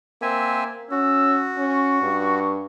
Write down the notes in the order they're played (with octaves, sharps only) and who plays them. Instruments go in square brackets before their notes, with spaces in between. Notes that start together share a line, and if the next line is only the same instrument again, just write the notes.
[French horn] A#3 [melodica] C4 E5 G#5
[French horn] C#4 [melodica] F#4 [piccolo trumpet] E6
[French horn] C#4 [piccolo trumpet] C#6
[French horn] G2